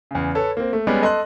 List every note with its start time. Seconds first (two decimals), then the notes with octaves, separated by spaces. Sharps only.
0.11 E2 C#3
0.35 A4 B4 C#5
0.57 A#3 C4
0.73 A3
0.87 G3 G#3 B3 C#4 D5
1.02 A4 D#5 C6 F#6